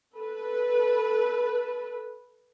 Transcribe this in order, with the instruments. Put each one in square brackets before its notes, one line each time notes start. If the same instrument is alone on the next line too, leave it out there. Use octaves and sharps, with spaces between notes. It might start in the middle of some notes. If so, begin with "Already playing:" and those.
[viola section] A4 B4